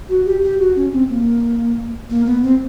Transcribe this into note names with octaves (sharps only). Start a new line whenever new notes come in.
F#4
G4
G4
F#4
C#4
C4
A#3
A#3
B3
C4